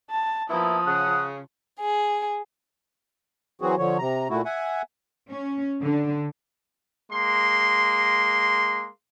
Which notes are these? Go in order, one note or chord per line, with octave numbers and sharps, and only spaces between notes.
A5
F3 A#3 B3 E4 D#6
C#3 F#5
G#4
E3 F#3 C4 F#4 G#4
D3 F3 C#5
C3 A#5
A#2 A3 E4 F#4
E5 F#5 G#5
C#4
D3
G#3 A#3 C6